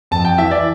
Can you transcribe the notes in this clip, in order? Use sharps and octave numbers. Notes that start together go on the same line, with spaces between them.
F2 A5
G5
E3 E5
D5